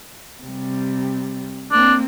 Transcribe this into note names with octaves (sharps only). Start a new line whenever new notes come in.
C3 G3
A#3 C4 D4